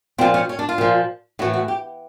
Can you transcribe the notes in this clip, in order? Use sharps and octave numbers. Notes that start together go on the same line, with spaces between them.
A#2 F3 C4
C#4
C#4
D4
F4
A#2 F3
A2 E3 F#4
F#4
G4